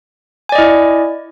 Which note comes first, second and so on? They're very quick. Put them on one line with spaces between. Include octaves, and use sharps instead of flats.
G#5 D5 D#5 E4